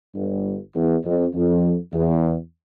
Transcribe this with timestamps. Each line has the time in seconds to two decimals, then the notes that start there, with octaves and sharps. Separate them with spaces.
0.15 G1 G2
0.75 E2
1.04 F2
1.34 F2
1.93 E2